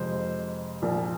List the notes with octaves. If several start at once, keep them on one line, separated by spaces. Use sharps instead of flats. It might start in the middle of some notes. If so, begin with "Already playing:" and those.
Already playing: F2 C3 G#3 C5
A#1 A#2 F3 A#3